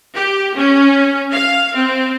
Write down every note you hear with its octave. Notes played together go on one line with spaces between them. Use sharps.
G4
C#4
F5
C4